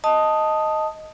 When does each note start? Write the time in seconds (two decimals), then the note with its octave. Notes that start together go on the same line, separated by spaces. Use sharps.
0.04 D#5 A5 D#6